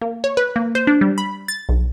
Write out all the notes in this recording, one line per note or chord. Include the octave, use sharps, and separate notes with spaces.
A#3
C#5
B4
A#3
C5
D4
G3
B5
A6
B1